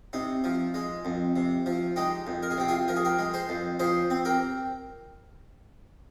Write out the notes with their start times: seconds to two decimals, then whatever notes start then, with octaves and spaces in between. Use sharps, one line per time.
0.13 C3 D#4
0.44 F3
0.74 G#3
1.05 F2
1.36 C3
1.66 F3
1.96 G#3 D#4 G4
2.27 F2
2.43 A#4
2.51 G#4
2.58 C3 G4
2.68 F4 G#4
2.88 F3 A#4
2.96 G#4
3.05 G4 A#4
3.18 G#3
3.34 G#4 C5
3.49 F2
3.80 F3 G#4 C5
4.10 C4
4.25 G4 A#4